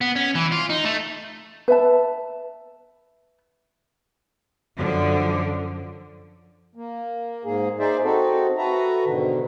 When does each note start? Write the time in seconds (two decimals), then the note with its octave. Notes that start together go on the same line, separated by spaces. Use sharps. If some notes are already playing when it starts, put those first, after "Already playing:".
0.01 B3
0.16 C#4
0.35 E3
0.52 F4
0.70 D#4
0.85 A3
1.68 B4 E5 A5
4.77 F#2 D3 F3
6.75 A#3
7.45 G#2 A#3 G#4
7.79 D#4 G#4 C5 D5 E5
8.04 C4 D#4 F#4 A4
8.58 F#4 A4 B4 E5 A#5
9.05 G#2 B2 D3 D#3